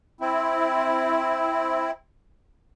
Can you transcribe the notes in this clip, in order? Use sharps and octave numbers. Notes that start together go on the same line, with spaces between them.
C4 E4